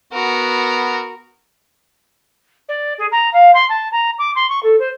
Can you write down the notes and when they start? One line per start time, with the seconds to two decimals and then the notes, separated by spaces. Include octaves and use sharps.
0.13 B3 F#4 A#4
2.69 D5
2.98 G#4
3.12 A#5
3.33 F5
3.54 C6
3.69 A5
3.92 A#5
4.19 D6
4.35 C6
4.49 C#6
4.63 A4
4.79 C5